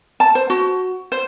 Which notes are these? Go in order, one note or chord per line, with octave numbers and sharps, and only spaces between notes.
A5
C5
F#4
C5